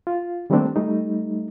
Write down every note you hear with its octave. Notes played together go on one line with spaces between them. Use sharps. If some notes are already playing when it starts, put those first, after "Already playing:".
F4
D#3 G3 A3 A#3 C4 D4
G3 A3 D#4